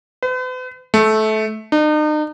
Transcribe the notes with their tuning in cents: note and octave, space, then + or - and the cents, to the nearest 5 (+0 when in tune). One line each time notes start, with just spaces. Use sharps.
B4 +45
A3 -20
D#4 -40